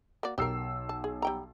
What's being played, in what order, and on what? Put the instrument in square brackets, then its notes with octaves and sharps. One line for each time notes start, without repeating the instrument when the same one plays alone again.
[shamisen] A#3 F#4 D5
[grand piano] B1 E6 C7 [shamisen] G4 A#4
[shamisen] A5
G#4
G3 G5 A#5